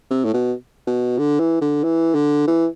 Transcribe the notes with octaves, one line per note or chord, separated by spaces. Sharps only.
C3
A2
B2
B2
D3
E3
D3
E3
D3
E3